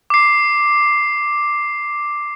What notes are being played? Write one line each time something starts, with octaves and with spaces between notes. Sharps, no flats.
D6 C7